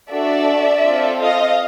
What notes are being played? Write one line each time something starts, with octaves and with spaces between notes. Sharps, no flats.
D4 F#4 A4 D5 E5
C4 F4 A4
D#5 F5